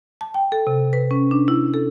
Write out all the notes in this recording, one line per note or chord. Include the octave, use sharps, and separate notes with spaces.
A5
G5
A4
C3
B4
C#4
D4
E4
A4